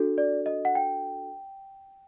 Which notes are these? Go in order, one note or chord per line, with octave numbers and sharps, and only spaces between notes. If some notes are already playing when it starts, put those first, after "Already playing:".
Already playing: D4 F#4 A4
D5
D#5
F#5
G5